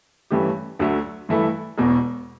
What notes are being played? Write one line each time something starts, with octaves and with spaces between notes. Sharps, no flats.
G2 E3 A3 C#4 G4
D2 D3 F#3 A3
G2 E3 A3 E4 A4
E1 E2 B2